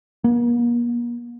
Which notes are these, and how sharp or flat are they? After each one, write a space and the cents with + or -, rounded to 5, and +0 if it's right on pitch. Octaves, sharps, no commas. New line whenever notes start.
A#3 +40